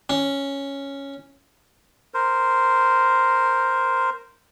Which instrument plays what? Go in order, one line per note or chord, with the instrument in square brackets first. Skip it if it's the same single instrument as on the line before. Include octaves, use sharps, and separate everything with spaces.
[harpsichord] C#4
[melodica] A#4 C5